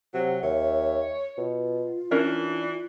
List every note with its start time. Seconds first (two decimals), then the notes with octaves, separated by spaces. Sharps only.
0.14 C3 F#3 F#5
0.43 D#2 C#5 E5
1.37 B2 F4
2.11 E3 C#4 D4 A#4 E5